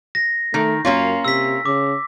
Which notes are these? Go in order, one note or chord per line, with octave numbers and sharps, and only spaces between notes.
A#6
D#3 A3
F#2 A#3 C#4 F4
C3 E6 B6
C#3 D6